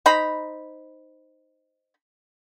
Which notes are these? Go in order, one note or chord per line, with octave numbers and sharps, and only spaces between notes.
D#4 C5 A#5 B5